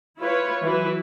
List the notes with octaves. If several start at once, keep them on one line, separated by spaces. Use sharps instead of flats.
E4 F4 B4 C#5
E3 F#3 E4 B4